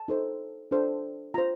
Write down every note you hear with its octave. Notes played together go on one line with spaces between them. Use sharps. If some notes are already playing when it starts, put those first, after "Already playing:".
Already playing: A5
D#4 A4 C5
D4 A4 C5
F4 C5 A#5